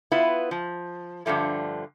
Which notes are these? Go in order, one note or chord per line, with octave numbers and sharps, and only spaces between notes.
B3 E4 F4 B4
F3
G2 A#2 D3 F3 A3